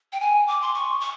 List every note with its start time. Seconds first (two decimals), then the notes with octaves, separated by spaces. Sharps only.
0.12 G5
0.20 G#5
0.47 D6
0.62 C6
0.74 C#6
1.01 C#6